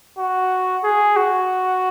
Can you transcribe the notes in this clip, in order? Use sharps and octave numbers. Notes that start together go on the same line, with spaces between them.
F#4
G#4
F#4